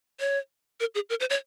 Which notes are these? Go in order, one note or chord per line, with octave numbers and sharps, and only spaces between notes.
C#5
A#4
G#4
A#4
C5
C#5